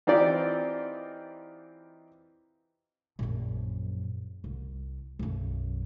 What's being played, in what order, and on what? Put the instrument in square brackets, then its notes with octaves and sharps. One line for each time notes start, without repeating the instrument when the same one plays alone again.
[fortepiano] E3 C4 D#4 F4 G4 D5
[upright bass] A#1 F#2
C2
B1 F#2